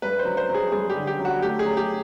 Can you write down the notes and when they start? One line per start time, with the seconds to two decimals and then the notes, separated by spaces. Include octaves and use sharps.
0.02 G2 B4
0.19 C5
0.25 F#3
0.37 C5
0.49 F#3
0.54 G#4
0.72 G2 G#4
0.90 G4
0.96 D3
1.07 G4
1.19 F#3
1.25 F#4
1.42 A3 G4
1.59 G#4
1.66 F#3
1.77 G4